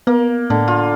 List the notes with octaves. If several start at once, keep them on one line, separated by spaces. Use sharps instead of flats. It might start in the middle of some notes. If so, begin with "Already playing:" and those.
A#3 B3
A2 D3
F4